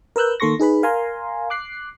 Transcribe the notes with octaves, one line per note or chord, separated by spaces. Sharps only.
A#4 B4 E6 F#6 G6
D#3 A#3 A4 C6 C#6 A#6
D#4 G#4 B4 B5
A#4 F5 G#5 A#5 C6
D6 F#6 C7